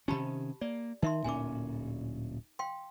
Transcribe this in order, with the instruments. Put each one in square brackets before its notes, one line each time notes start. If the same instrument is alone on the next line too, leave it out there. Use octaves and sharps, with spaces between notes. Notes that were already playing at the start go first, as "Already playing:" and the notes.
[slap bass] C3 D#3 C#4 [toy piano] G4 A5 B5
[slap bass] A#3 [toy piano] D5
[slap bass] D#3 [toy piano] D#4 E5 C6
[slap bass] D1 A#2 C#4 [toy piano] G#5 D6
[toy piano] F5 G5 C6